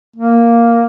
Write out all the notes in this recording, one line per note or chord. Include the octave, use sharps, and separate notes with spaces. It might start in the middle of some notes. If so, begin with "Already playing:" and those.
A#3